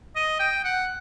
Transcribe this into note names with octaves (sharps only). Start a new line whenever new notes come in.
D#5
G5
F#5